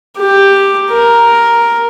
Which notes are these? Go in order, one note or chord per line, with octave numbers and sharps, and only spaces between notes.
G4
A#4